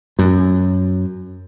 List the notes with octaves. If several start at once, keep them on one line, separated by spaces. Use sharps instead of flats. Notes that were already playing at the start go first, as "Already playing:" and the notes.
F#2